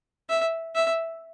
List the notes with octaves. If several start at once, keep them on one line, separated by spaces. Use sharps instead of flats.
E5
E5